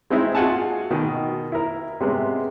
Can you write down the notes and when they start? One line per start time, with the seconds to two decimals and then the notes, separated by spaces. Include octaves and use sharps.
0.10 G#3 C4 D#4 E4
0.35 F4 F#4 G#4 F#5 G#5 A5
0.90 B2 D#3
1.52 E4 A#4
2.00 C3 G#3 B3 C#4